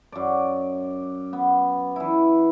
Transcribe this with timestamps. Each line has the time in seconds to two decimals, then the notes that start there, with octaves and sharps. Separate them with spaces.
0.12 F#2 D5
1.33 B3
1.96 E3 E4